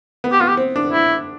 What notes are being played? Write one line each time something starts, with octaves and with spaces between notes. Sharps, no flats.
B3
G4
B3 F4
G4
C4
D4
E4